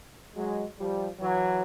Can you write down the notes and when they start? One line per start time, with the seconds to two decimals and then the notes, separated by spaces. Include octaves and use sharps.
0.35 F#3 G#3
0.78 F3 G3
1.20 E3 F#3